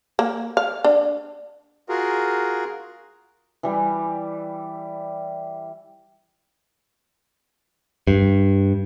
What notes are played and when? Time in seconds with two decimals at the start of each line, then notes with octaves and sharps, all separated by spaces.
0.19 A#3
0.57 F5
0.84 D4
1.89 F4 F#4 G#4 A#4
3.63 E3 G3
8.07 G2